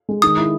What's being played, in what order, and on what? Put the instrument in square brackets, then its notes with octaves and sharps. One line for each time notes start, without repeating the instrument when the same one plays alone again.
[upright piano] G#3
[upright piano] D#3 [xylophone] D#6
[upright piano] E4